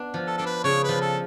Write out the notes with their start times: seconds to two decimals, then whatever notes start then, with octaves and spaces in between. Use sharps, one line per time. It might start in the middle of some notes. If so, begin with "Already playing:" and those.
Already playing: B3 D4
0.14 F3
0.27 A4
0.37 D4 A4
0.46 B4
0.64 C#3 C#5
0.83 B4
0.89 F3
1.01 A4